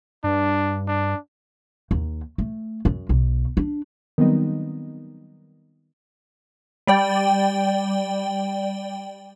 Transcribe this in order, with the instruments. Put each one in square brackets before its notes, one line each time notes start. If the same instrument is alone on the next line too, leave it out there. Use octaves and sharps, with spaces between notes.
[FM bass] G2 [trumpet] D4
[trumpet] D4
[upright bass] D#2
A3
F#2
B1
D4
[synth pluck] D#3 F#3 G3 B3 C4 D#4
[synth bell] G3 D5 G5